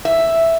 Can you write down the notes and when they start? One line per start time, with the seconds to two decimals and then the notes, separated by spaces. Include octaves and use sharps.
0.05 E5